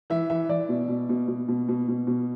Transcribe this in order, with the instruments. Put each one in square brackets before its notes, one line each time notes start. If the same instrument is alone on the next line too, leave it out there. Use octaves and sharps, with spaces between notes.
[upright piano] E3 E5
E3 E5
E3 D5
B2
B2
B2
B2
B2
B2
B2
B2